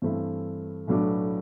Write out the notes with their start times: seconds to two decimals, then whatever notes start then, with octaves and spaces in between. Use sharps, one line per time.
0.02 G2 E3 A3 C4 E4
0.87 B1 A2 F#3 B3 D4